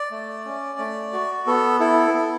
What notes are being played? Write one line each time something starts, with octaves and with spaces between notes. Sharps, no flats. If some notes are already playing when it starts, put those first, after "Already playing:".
Already playing: D5
A3
C#4
A3
F#4
B3 A4
E4 A4
B3 A4